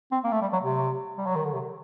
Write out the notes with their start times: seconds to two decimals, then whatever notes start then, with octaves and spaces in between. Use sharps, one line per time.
0.12 C4
0.24 A#3
0.32 A3
0.42 G3
0.53 F#3
0.63 C3
1.18 G3
1.26 F#3
1.35 D#3
1.45 D3
1.53 C3